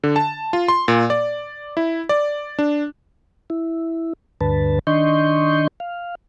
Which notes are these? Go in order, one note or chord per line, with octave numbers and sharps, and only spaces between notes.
D3
A5
F4
C6
A#2
D5
E4
D5
D4
E4
D2 G2 D3 B4 A5
D#3 D4 D#5 C6 C#6 G6
F5